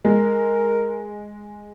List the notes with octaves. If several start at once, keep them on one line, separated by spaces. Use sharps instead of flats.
G#3 A#4